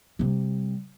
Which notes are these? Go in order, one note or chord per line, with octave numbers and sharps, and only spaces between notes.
C3 G3